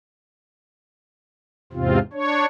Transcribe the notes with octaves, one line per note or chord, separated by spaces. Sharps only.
E2 G#2 C3 C4 F4
D4 C#5